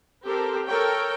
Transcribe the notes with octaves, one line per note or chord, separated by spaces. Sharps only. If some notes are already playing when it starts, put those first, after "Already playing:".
C4 G4 A4 A#4 C5
A4 A#4 C#5 G5